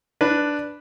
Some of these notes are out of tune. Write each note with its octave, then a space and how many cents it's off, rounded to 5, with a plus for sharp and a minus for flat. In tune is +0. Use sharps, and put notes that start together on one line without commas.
D4 +0 B4 +0